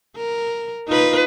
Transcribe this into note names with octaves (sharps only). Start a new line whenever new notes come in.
A#4
D#4 F4 B4